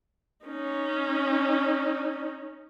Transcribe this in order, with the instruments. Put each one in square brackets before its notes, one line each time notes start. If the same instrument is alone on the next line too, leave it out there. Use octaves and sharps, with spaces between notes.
[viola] C#4 D#4